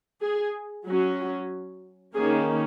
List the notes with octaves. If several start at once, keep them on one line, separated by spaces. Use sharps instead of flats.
G#4
F#3 C#4 F#4
D#3 A#3 C#4 G#4